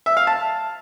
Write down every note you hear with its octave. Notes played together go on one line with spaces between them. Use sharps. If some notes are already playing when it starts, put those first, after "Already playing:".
E5
F5
A5